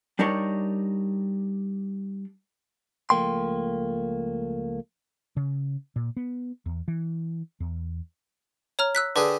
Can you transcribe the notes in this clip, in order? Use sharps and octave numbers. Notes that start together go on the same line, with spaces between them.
G3 D4 D#4 A#4 C#5
C#2 F3 A3 A#3 G5 C6
C#3
A#2
B3
E2
E3
E2
C#5 A#5 F6
E6 F#6 B6
D3 G4 G#4 B4